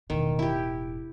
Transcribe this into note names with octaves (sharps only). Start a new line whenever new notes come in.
E1 A2 D#3
E4 G4